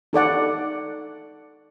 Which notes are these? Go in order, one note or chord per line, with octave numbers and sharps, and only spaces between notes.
D#4 A4 D5 F#5